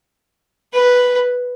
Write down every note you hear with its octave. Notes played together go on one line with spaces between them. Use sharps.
B4